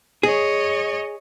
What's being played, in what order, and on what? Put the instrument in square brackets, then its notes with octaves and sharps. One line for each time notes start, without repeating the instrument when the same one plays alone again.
[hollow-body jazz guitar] G#4 [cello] C#5 D#5